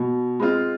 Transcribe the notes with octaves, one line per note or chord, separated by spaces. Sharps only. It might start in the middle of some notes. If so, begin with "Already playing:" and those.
Already playing: B2
G#3 C4 F4